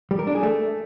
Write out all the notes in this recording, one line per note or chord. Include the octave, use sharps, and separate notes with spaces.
G3
A#4
D4
G#4
A3